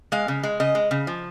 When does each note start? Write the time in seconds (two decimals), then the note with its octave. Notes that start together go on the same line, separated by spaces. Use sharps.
0.12 G#3 F5
0.28 C#3
0.43 G#3
0.60 C#3 D#5
0.75 G#3
0.91 C#3
1.07 F3